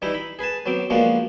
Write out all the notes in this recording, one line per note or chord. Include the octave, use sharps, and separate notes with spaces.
E3 G3 D#4 E4
B5
G#4 B4 G#5 A5
F#3 B3 C4 D6
F3 G#3 A#3 B3 D4 F#4